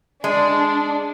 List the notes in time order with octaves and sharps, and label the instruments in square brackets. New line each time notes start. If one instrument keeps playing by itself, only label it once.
[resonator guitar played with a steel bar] G#3 [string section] D4